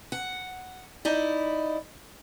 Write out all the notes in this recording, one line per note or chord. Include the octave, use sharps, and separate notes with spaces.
F#5
D#4 E4 D5